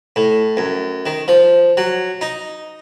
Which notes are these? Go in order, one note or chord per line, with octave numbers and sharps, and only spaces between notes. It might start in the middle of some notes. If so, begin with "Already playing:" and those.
A2
F#2
D#3
F3
F#3
D#4